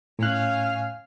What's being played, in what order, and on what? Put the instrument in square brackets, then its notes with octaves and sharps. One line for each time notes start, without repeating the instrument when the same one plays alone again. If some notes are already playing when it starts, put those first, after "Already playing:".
[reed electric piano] A2 F#6 [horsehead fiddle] C#4 F5